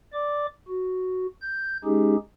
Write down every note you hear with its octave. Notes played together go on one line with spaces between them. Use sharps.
D5 D6
F#4
G6
G#3 C#4 D#4 G4 G#4